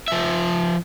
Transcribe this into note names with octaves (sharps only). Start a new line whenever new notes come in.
F3 E5